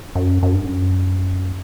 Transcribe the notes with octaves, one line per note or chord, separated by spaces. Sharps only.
F#2
F#2
G2
F#2